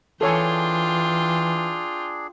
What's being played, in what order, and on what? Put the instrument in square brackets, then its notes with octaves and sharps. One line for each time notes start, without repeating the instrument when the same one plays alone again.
[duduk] E3 [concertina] D4 G#4 [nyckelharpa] F4 G5 [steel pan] A4 C#5 G#5